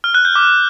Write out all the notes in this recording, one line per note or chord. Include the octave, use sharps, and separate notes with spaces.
F6
F#6
G6
D6